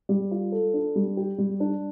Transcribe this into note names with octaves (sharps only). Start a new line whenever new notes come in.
G3
F4
A4
D4
G3
G4
G3
D4